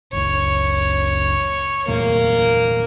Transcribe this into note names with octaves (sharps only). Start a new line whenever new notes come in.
F#1 C#2 C#5
E2 A#2 A3 A#3